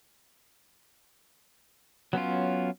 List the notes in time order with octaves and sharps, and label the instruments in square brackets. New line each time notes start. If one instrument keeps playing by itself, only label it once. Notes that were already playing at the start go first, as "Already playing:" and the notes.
[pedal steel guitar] F#3 B3 C#4 F4